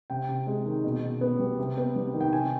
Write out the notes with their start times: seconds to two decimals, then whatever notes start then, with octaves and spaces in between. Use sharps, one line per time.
0.10 C3 G5
0.29 C3
0.47 G#3
0.66 D#3
0.84 B2
1.03 B2
1.21 B3
1.39 G3
1.59 C3
1.77 B3
1.96 G3
2.14 D#3
2.21 G5
2.33 C3 G#5